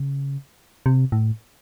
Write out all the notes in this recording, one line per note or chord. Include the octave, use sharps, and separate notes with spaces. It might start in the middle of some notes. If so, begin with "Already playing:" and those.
Already playing: C#3
C3
A2